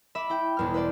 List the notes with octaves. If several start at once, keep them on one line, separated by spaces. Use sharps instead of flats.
E5 B5 D6
E4 G5
E1 E2 F6
B4 C5 D5